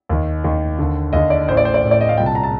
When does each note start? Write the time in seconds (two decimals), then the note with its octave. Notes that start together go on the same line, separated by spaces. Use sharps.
0.09 D#2 D#3
0.44 D#2 D#3
0.79 D#2 D3
1.13 D#2 D3 D#5
1.30 D5
1.48 A1 C5
1.51 A2
1.57 D5
1.65 C5
1.74 D5
1.83 A1 A2
1.91 D5
2.01 D#5
2.09 F5
2.17 C2 A#2 G5
2.26 A5
2.35 A#5
2.43 A5